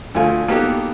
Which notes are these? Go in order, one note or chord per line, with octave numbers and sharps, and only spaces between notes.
D2 F3 A3 F4 G#5
A#3 B3 D#4 F#4 G4 A4